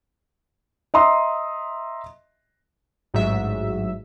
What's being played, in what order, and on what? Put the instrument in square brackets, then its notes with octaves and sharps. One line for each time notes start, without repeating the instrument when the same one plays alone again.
[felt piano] D#5 E5 A#5 C6 D#6
[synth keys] A1 G#2 F#3 E5